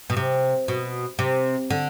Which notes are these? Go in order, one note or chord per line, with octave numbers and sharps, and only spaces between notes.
B2
C3
B2
C3
D3